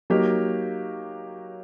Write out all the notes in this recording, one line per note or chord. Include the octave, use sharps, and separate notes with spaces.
F#3 A#3 D#4 G4 A#4